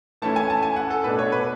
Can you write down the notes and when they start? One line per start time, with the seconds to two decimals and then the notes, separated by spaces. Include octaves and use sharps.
0.22 E3 A3 C#4 E4 A5
0.36 G#5
0.50 A5
0.63 G#5
0.76 F#5
0.90 A4
1.04 B2 A3 D4 B4
1.19 C#5
1.32 B4